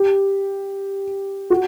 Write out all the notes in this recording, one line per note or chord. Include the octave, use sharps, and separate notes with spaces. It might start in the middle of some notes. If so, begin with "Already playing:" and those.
Already playing: G4
F#4